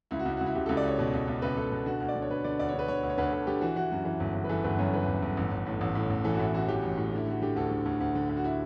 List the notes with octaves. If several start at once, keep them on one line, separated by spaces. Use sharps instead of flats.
C#2 E4
F#4
C#2 E4
C#2 F#4
E4
C#2 G4
C#2 A4
D5
C#2 C#5
B2
C#2
C#2
C#2 B4
C#2 A4
B2
D3 F#4
D2
D5
D3
C#5
D3 B4
D3 D5
D2 D5
C#5
D3
B4
D3 C#5
D2
C#5
D2 B4
D2 A4
D3 G4
E3 F#4
E3 F#4
F#2 F#4
E3
G1
G1
B4
E3 A4
G1 B4
F#2 C#5
E3 B4
G1
G1
A1
A1
A2
A1
A2
A1
E3 A4
F#4
A2 E4
A1 F#4
E3 G4
A1
A2
D3 E4
D3 F#4
D3 G4
D2 A4
D3
D2
D2
D3
D2
F#4
E4